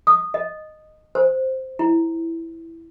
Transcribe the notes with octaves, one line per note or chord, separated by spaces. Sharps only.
D#6
D#5
C5
E4